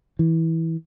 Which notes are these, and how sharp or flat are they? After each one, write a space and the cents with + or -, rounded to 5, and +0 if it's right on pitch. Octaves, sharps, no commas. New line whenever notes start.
E3 -15